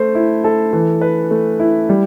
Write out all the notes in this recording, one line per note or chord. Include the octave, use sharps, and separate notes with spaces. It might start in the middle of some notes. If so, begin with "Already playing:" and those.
Already playing: A3 C5
E4
A4
E3
B4
A3
E4
G3